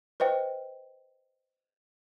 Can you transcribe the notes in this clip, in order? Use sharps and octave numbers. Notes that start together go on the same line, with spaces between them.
B4 C5 D#5 G5